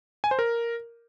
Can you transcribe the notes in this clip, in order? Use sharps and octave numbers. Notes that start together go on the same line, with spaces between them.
G#5
C5
A#4